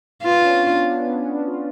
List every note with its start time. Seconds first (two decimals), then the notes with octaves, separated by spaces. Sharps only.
0.24 B3 F4
0.38 D4
0.44 C#4
0.86 D4
1.06 B3
1.20 C#4
1.33 D4
1.47 F4